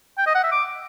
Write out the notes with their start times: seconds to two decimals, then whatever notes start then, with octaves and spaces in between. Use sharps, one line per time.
0.18 G5
0.26 D#5
0.35 F#5
0.43 E5
0.52 D6